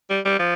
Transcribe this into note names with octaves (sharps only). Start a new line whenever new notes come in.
G3
G3
F3